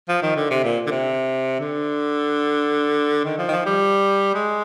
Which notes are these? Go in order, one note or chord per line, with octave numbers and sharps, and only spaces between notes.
F3
D#3
D3
C3
A#2
D3
C3
D3
D#3
F3
D#3
F3
G3
G#3